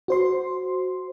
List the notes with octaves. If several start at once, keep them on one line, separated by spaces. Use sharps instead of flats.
F#4 C5 C6